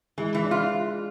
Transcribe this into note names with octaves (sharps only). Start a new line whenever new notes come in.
E3 G#3
E3
D4
F4